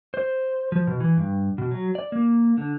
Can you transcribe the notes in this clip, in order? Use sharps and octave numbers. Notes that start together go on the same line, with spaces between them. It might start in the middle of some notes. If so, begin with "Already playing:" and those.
C5
F3
B2
E3
G2
B2
F#3
D5
A#3
D3